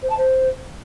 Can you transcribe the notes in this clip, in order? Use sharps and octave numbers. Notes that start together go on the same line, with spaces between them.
C5
A5
C5